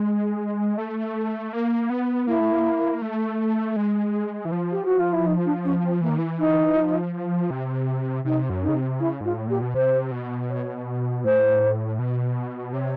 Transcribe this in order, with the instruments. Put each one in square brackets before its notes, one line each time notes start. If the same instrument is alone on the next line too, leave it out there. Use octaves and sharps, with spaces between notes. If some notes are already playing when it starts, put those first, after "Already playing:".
Already playing: [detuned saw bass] G#3
A3
A#3
B3
[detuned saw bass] A#3 [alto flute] E4
[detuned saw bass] A3
A#3
A3
G#3
E3
F3
[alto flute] G4
F#4
F4
E4
D#4
D4
C#4
C4
[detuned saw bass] E3 [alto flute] A#3
[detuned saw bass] D#3
E3
[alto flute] D#4
[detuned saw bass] F3
C3
[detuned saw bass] C3 [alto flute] D#4
[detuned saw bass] F#2
[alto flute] D#4
[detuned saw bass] C#3
C3
[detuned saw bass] C#3 [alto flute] E4
[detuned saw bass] G#2 [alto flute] F4
[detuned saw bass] A2
[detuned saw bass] A#2 [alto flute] G4
[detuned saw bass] B2
[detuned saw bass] C3 [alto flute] C5
[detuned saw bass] B2
[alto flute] C#5
[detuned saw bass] A2 [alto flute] C5
[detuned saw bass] B2
[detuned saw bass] C3 [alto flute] C#5